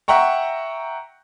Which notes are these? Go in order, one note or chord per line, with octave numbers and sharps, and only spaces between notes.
E5 F#5 G5 A#5 C#6